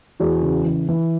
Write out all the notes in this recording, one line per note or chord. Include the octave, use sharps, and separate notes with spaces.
E2 F#4 G#4
C#3
E3
E3